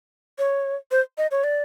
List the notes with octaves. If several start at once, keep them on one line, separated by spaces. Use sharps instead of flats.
C#5
C5
D#5
C#5
D5